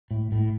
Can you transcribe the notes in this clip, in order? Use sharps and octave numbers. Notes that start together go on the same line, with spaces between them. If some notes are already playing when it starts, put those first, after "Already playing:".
A2
A2